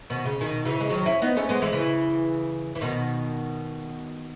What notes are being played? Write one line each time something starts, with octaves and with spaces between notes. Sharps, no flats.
B2 D#3
C#3
B2 D#3
C#3 E3
G#3
D#3 F#3
C#4 E4
B3 D#4
A3 C#4
G#3 B3
E3 G#3
C#3 E3
E3
B2 D#3